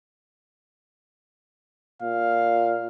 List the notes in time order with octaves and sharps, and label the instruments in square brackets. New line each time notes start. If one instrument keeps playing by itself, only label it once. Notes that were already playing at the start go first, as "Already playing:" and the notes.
[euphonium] A#2 [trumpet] F5